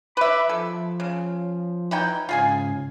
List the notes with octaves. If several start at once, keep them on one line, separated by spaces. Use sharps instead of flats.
B4 E5 B5 D6
F3 A4
C#3
E3 D#4 G5
G#2 C#3 F4 G#4 G#5